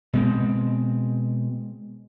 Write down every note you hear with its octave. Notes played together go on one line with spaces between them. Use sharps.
B2 G#3 C4